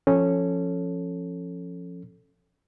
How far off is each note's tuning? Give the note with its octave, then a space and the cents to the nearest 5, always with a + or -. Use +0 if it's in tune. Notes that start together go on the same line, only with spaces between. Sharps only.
F3 +0 C#4 -10 A4 +0